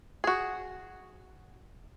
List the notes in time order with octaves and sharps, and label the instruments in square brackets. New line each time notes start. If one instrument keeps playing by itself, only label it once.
[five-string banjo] F#4 G#4